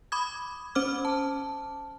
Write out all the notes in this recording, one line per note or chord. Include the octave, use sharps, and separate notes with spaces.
B5 D6 D#6 G#6
C#4 C5 D6 F6
A5